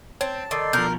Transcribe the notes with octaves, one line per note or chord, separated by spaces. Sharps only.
C4 C#5 A5
D#3 A4 D5 C6
B2 F3 A#4 G6